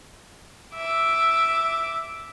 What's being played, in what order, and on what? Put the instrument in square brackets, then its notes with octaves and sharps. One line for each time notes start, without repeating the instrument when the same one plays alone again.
[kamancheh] E5 D6